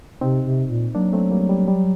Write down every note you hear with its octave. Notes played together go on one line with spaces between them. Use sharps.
C3 C4 D#4
C3
A#2
F#3 A#3 D4
A3 C4
G3 A#3
G3
G3